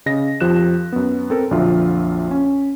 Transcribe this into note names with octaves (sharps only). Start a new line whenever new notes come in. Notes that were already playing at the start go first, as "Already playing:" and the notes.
C#3 D#5 A#6
F2 F3 G4 F#6 E7
F#2 B3
C4 A4 A#4
A#1 F2 D3 F#3 F4 E5
C#4